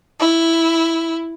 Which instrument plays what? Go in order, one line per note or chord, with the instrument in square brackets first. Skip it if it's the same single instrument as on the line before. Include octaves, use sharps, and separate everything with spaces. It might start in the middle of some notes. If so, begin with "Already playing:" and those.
[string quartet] E4